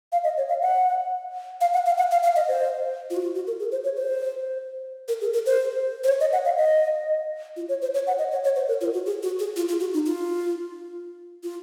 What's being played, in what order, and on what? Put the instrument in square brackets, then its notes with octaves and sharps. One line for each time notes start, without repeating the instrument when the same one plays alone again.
[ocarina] F5
D#5
C#5
F5
F#5
F5
F#5
F5
F#5
F5
F5
D#5
C5
F4
F#4
F4
F#4
A#4
G#4
C5
C#5
C5
A#4
G#4
A#4
C5
C5
C#5
D#5
F#5
F5
D#5
F4
C#5
C5
C#5
F#5
D#5
C#5
C#5
C5
A#4
F4
F#4
G#4
F#4
G#4
F4
F4
F#4
D#4
F4
F4